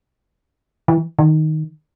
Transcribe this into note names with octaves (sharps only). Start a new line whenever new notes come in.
E3
D#3